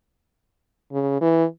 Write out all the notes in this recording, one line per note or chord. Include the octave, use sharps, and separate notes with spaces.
C#3
E3